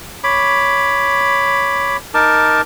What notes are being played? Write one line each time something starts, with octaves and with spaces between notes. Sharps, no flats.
C#5 B5 D6
D#4 A#4 A5 D6